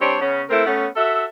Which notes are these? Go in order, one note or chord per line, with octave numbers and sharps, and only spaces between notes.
G3 C4 D4 C5 C#5
C#3 B3 C#4
A3 C4 E4 A#4
A3 B3 C#4
F#4 A4 E5